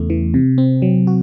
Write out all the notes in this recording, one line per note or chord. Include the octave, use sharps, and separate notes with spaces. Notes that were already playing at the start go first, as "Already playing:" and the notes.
Already playing: E2 C#3 A3
E3
C3
C4
F#3
F#4